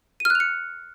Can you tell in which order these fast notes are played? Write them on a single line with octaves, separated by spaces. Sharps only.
D#7 F6 F#6 F7 C#7